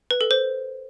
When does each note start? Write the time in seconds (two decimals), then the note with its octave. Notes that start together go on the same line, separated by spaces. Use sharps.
0.11 B4
0.21 A4
0.31 C5